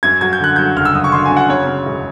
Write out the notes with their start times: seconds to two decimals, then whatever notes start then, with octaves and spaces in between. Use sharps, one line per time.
0.03 F#2 G#6
0.21 F#3 G#6
0.33 G6
0.40 D3 F#6
0.56 F#3 G6
0.76 F#1 F6
0.85 E6
0.95 F#1 D#6
1.04 C#6
1.12 D3 C6
1.25 G#5
1.31 F#2
1.37 F#5
1.49 C#3 C#5
1.67 C#3
1.86 E1